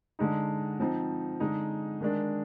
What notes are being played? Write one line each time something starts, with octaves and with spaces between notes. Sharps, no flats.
D3 G#3 D#4
F3 C4 D#4
D3 G#3 D#4
D#3 G#3 D4